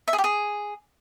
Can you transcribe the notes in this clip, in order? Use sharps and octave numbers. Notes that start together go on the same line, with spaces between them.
E5
G#4
G4
G#4